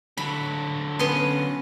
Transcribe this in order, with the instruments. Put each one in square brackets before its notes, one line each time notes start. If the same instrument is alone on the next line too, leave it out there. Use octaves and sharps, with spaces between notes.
[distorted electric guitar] D3 F#3 [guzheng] B5
[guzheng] B3 C6 [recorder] C#4